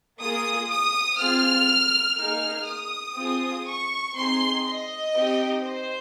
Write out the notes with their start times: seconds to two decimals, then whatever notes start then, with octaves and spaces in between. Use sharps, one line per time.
0.20 A#3 F4 G#4 D#6
0.70 D#6
1.18 C4 F4 G#4 F6
2.17 A#3 D#4 G#4 F6
2.66 D#6
3.16 C4 F4 G#4
3.66 C#6
4.15 C4 D#4 G#4 C6
4.65 D#5
5.15 C4 D#4 G4
5.63 C5